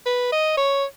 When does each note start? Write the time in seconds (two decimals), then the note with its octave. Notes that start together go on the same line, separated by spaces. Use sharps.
0.06 B4
0.32 D#5
0.57 C#5